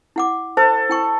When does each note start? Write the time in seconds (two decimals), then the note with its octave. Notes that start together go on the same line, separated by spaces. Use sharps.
0.16 E4 F#5 D6
0.57 A4 C5
0.90 E4 G5 C#6